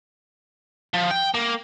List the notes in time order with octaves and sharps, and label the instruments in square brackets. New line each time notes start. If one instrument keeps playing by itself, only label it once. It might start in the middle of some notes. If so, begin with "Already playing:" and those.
[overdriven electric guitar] F3
G5
A#3